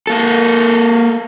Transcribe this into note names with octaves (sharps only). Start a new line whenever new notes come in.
A#3 A4